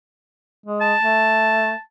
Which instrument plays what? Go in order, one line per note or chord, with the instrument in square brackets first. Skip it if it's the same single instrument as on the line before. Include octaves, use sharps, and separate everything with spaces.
[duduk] G#3
[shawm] A5
[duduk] A3